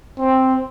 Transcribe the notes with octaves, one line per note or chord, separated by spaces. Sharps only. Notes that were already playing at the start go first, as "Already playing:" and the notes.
C4